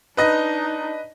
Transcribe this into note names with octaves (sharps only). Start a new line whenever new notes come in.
D4 D#4 B4 D#5 A#6